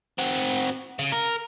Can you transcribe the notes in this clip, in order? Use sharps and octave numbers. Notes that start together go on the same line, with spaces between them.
C4 F#4
C#3
A#4